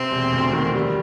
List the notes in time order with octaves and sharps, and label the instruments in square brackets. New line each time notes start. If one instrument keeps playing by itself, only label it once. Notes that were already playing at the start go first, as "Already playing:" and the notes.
Already playing: [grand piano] C3 [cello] C4
[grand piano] E1
D2
D#3
G3